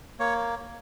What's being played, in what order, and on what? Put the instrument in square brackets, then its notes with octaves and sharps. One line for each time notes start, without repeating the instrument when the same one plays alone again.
[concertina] A#3 C#5